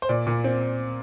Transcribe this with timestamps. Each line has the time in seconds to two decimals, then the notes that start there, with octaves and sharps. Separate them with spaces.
0.02 C5
0.09 A#2 D5
0.27 A#2
0.44 C4